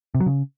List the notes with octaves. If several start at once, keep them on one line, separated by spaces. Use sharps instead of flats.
C3
F#3
C#3